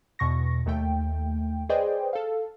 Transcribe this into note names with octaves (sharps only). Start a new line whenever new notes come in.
E2 B2 C#6 A#6
D#2 A3 G5
G#4 B4 C5 D5 D#5 G5
A4 F5